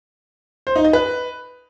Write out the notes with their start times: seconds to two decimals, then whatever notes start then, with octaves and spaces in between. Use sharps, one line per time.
0.67 C5
0.76 D#4
0.84 D#5
0.93 B4